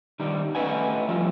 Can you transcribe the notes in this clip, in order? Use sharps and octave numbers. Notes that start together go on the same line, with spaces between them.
D#3 G3 D4
A3 C#4 B4 D#5 F#5 G#5
F3 G3 A3 F4